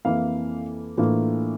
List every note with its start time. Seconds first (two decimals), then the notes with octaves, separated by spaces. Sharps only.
0.05 F2 E3 A#3 E4 F5
0.97 A2 E3 A#3 D4 F4